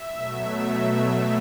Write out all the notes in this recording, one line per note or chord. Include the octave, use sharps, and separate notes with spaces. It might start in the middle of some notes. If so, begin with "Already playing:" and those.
Already playing: E5
B2 F#3 A3